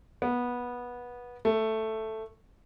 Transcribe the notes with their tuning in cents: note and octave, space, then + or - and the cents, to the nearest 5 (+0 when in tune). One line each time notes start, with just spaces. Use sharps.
B3 -15
A3 +5